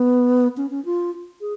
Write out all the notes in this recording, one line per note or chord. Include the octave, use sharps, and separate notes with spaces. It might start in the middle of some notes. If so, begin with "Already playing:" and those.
Already playing: B3
C#4
C#4
F4
G#4